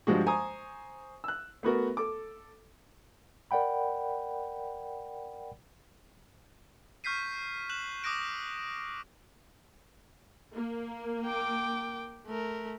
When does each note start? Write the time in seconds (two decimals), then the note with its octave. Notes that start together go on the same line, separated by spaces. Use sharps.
0.07 G2 F3 G3 G#3 F#4
0.26 C5 G#5 A#5 C#6 D#6
1.24 E6 F#6
1.63 A3 B3 F#4 A#4
1.97 A4 D6
3.51 A#4 D5 F#5 G5 B5
7.04 C#6 F6 G6 B6 C7 D#7
7.69 F#6 E7 F#7
8.04 D6 D#6 F#6 A#6 D7
10.55 A#3
11.25 G5 D6
12.27 A3 A#4